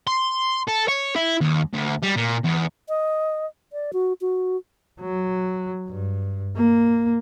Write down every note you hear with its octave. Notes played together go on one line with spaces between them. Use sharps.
C6
A4
C#5
E4
D#2
D2
G3
A#2
E2
D#5
D5
F#4
F#4
F#3
G2
A#3